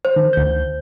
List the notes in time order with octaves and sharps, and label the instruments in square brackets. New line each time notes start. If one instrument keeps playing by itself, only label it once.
[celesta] C5
[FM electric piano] D#3
D2 G6